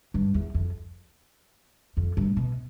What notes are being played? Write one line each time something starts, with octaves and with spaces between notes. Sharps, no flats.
G2
E2
F2
F2
G2
B2